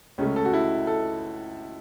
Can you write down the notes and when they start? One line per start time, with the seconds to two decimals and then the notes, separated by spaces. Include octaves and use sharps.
0.18 C#2 C#3 A3 C#4
0.36 A4
0.45 F#4
0.54 E4
0.87 A4